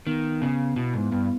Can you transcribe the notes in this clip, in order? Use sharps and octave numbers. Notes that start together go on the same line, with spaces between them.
D#3 B3
C#3 B3
B2 E4
G#2
G2 B3